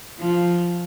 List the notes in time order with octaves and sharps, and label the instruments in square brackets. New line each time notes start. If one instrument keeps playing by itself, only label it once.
[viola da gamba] F3